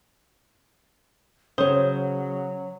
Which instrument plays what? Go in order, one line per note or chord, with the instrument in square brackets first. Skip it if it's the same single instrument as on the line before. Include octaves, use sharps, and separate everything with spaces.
[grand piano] C#3 D#6 G7 [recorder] F#3 [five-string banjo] C5 C#5